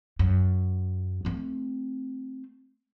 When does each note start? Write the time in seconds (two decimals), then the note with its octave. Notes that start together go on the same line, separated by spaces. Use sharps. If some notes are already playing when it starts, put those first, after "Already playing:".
0.19 F#2
1.25 A3 C4